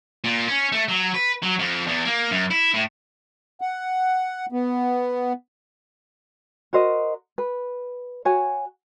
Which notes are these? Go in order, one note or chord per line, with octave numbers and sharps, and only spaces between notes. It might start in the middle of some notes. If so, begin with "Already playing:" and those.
A#2
C#4
A3
F#3
B4
F#3
F2
E2
A#3
F#2
E4
A2
F#5
B3
F#4 A#4 C5 D#5
B4
F#4 C#5 G#5